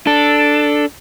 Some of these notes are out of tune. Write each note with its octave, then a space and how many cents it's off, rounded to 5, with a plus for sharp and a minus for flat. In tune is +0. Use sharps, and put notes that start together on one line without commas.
D4 +0 A4 +0